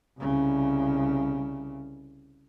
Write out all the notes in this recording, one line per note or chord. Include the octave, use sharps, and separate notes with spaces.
C2 C#3